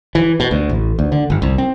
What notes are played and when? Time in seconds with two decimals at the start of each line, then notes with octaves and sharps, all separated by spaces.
0.15 E3
0.40 B2
0.51 D2
0.69 A1
0.99 D2
1.12 D3
1.30 G1
1.42 C2
1.58 C4